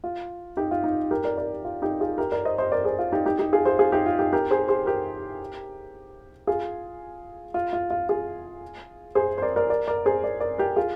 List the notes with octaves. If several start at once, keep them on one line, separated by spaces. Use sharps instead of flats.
F4
D#4 G4
F4
D#4
G4 A#4
A#4 D5
A#4 D5
F4
D#4 G4
F4 G#4
G4 A#4
A#4 D5
C5 D#5
C5 D#5
A#4 D5
G#4 C5
F4
D#4 G4
D#4 G4
D#4 G4
F4 G#4
G#4 C5
F4 G#4
D#4 G4
F4
D#4 G4
G4 A#4
G#4 C5
G#4 C5
G4 A#4
F4 G#4
F4
F4
F4
F4 G#4
G#4 C5
C5
A#4 D5
A#4 D5
A#4 D5
A#4 D5
G#4 C5
A#4 D5
A#4 D5
G4 A#4
F4 G#4